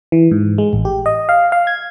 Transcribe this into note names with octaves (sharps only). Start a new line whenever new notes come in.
E3
G#2
G#3
A1
G4
D#5
F5
F5
G#6